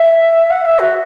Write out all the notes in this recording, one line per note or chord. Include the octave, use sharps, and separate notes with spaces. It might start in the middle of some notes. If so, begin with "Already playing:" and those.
Already playing: E5
F#5
E5
F#4